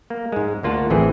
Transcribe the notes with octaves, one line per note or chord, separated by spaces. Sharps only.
A#3
G#2 G#3
D2 A#3 F4 F#5 A5
A1 A2 E3 C4 G#4